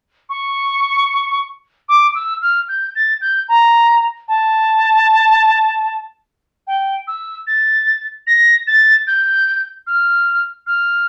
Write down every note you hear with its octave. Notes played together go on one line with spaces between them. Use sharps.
C#6
D6
E6
F6
G6
A6
G6
A#5
A5
G5
E6
A6
A#6
A6
G6
F6
F6